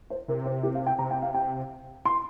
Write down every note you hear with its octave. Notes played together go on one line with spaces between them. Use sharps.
C5
C3 A#4
C5
G4
F5
G5
C3 A#5
G5
F5
G5
C6